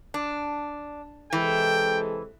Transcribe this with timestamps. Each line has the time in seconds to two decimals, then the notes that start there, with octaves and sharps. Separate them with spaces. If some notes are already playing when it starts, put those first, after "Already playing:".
0.14 D4
1.33 C3 E3 G#3 A4 G5